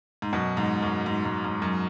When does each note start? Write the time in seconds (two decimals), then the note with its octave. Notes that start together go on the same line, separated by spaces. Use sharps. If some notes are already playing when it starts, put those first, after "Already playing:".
0.22 G#2
0.33 F#2 B2
0.57 G#2
0.82 F#2
1.06 G#2
1.25 G#2
1.44 G#2
1.62 F#2